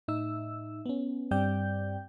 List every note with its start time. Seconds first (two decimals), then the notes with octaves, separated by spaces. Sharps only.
0.08 A2 D#4 E5 E6
0.86 B3 C#4
1.31 G2 G3 C4 D5 G5 G6